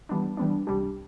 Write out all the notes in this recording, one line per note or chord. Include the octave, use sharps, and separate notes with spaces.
E3 G3 B3 D4
E3 G3 B3 D4
C2 C3 G3 D4 G4